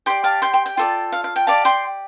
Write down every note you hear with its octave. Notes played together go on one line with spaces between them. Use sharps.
G4 D5 G5 C6
F5 A5
G5 C6
G5 C6
G5
F4 A4 D5
F5
F5
G5
G4 D5 F5 A5
G5 C6